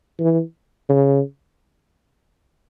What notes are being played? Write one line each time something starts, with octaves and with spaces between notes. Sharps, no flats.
E3
C#3